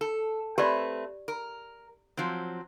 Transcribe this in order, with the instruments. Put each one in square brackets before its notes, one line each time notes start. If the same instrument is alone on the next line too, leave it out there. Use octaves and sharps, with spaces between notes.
[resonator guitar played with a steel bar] A4
[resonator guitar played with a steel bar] A3 C4 B4 [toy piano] G4 D5
[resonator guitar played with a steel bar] A#4
F3 F#3 C4